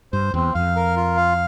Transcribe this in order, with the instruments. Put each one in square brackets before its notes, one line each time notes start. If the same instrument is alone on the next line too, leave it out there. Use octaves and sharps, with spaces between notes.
[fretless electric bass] G2 [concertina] C5
[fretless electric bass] E2 [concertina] C4
[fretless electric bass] F2 [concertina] F5
[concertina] A#4
F4
F5